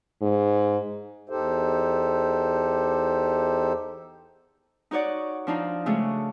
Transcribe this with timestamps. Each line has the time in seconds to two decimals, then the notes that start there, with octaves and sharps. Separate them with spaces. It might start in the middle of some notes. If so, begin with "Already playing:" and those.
0.21 G#2
1.29 E2 D#4 G4 A4 C5
4.91 D#4 F#4 C#5 D5 F#5
5.47 F3 D4 D#4 F4
5.86 C#3 G#3 A3 D4 F#4